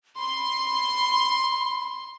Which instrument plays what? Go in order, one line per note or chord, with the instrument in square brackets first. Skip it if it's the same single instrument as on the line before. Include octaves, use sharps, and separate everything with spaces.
[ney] B5 [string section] C6